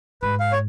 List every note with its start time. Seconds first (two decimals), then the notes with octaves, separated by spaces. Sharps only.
0.22 G#2 B4
0.40 F5
0.52 C#5